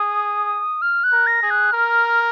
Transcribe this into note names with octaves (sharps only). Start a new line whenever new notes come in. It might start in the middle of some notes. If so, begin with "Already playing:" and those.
Already playing: G#4 D#6
F6
F#6
A#4
A#6
G#4
F#6
A#4 F6